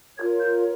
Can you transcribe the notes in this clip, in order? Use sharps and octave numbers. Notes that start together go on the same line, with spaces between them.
F4 A#4 C#5 G#6
G6